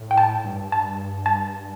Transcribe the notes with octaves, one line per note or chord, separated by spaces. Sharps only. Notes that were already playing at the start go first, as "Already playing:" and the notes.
Already playing: A2
G5
A5
G2
A5
A5